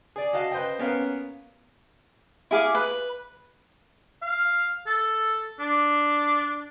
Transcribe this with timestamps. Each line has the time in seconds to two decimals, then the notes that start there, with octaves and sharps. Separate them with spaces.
0.16 G#4 D5
0.33 F#4 D#5 F5 A5
0.51 B4 C5 D#5 G5
0.79 A#3 B3 C#4 A#4 F5
2.51 E4 G#4 F5 D6
2.75 B4
4.22 F5
4.87 A4
5.59 D4